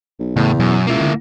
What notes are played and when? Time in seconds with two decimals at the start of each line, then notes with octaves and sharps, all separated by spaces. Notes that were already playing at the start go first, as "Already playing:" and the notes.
0.19 B1
0.36 E2 A2 C#3
0.60 F#2 B2
0.87 C#2 A#3 E4
1.01 D3